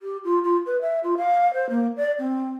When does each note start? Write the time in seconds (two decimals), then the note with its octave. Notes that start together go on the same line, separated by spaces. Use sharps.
0.01 G4
0.24 F4
0.44 F4
0.66 B4
0.81 E5
1.04 F4
1.17 F5
1.54 C5
1.70 A#3
1.97 D5
2.19 C4